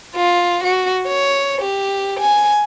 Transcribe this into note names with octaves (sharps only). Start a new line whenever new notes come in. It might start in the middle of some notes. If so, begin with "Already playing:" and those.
F4
F#4
C#5
G4
G#5